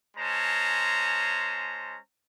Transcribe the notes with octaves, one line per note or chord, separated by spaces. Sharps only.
G#3 C#4 C5 A5 A#5